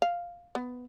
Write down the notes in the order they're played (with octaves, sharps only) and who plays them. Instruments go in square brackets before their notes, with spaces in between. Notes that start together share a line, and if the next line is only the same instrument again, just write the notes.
[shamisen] F5
B3